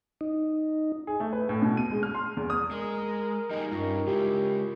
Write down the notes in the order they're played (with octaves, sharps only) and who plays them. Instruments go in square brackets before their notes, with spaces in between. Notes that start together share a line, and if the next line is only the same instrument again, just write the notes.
[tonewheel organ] D#4
[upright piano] G#4
A3
B4
A2
B2
D#7
G#3
F6
C6
E2
D#6
[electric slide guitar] G#3 [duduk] A#4
[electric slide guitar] G3 A#3 G#4 [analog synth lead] D#4
[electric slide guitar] G2 [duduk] C#4 [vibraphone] F4 A#4 C#6
[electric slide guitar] C#3 G#3 [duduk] E4 [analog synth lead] G4